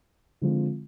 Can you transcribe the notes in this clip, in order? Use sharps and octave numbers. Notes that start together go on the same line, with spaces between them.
D3 F3 G#3 C4 F4